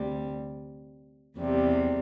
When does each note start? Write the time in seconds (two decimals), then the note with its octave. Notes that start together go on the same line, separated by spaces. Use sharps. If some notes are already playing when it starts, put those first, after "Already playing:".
Already playing: D2 C3 G3
1.38 E2 C3 G3